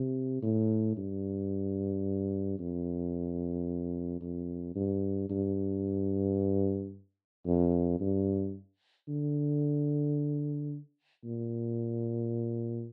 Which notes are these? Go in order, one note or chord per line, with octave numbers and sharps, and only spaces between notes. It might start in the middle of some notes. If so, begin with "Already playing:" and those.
Already playing: C3
A2
G2
F2
F2
G2
G2
F2
G2
D3
A#2